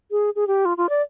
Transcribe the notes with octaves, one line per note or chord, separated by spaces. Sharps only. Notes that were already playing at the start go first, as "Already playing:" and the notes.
G#4
G#4
G4
F4
F4
D5